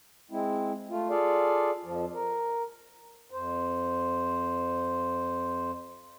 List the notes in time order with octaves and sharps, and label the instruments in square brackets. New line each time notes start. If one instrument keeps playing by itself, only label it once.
[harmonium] G#3 C4 E4
A3 F4
F4 G#4 A4 D5 F5
F2 F3
A#4
F2 C5